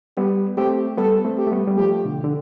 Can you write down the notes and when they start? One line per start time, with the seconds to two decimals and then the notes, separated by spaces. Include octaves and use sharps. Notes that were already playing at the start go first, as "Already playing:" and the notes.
0.17 G3 B3 G4
0.57 A3 C4 G4
0.97 G3 B3 A4
1.24 A3 C4
1.38 G4
1.47 A3
1.52 G3 B3
1.67 G3
1.78 F3 A3 G4
2.05 B2 D3
2.24 D3